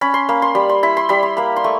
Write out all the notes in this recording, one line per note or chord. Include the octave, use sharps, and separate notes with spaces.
C#4 B5
C6
A#3 B5
C6
G3 B5
C6
E4 B5
C6
G3 B5
C6
A#3 B5
C6
A3 C#6